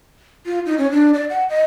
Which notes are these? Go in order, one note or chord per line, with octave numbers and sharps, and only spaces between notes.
F4
D#4
C#4
D4
D5
F#5
D#5